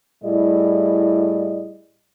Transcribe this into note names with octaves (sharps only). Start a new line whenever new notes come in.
A2 G3 E4 G#4 D5 D#5